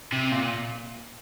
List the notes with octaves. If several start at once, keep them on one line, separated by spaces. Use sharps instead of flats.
C3
A#2